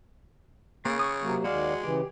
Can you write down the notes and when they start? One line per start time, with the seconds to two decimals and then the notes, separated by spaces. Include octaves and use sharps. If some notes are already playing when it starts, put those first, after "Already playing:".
0.85 C#3 A#3
0.99 C#6 D#6
1.22 C3 F#3 A#3
1.44 D#2 G#3 F#4 D5 F5
1.83 C#3 E3 G4